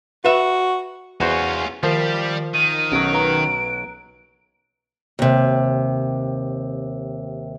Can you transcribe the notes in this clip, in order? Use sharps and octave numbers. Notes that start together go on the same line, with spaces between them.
F#4 B4 E5
E2 C#4 F4 F#4 C5
D#3 F3 G3 G4 A#4 C7
D#3 D#7
B1 F#3 C#4 D7
B4 A#5 F#6
D#2 C3